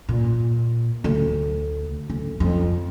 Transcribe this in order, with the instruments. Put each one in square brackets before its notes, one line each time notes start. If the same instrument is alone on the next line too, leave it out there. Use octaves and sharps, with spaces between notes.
[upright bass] A#2
D2
D2
F2